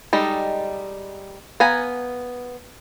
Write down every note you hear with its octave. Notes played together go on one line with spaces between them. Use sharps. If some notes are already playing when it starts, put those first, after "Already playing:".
G3 G#3 D#4 A4
B3 F5 F#5 G#5 A#5